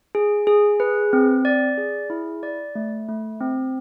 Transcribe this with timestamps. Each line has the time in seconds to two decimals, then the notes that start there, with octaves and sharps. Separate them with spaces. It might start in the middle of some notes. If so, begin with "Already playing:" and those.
0.15 G#4
0.47 G#4
0.80 B4
1.13 C4
1.45 D5
1.78 G#4
2.10 E4
2.43 D5
2.75 A3
3.09 A3
3.41 C4